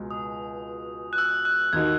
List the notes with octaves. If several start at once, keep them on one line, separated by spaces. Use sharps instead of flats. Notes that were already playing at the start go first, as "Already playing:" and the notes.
Already playing: C#2 B2 G#3
D#6
F#6
E6
F#6
D#2 D#3 A#3 D#4 F#4 G#6